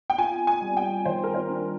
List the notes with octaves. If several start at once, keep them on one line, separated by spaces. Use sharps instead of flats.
G5
F4 G#5
G#5
G3
G5
D#3 C5
A#4
C5
D4